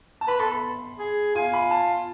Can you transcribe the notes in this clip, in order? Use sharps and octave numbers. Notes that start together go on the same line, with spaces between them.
A5
B4 B5
A4 C6
B5
G#4
F4 G#5
B5
A5